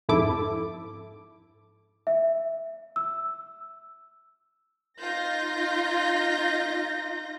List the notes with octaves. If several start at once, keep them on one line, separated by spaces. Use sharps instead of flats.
F2 G#2 E4 A4 D6
E5
E6
D#4 F4 G6 A#6